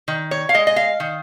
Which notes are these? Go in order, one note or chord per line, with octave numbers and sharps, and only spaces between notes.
D#3
C#5
F5
G#3 D#5
D#5
F5
D#3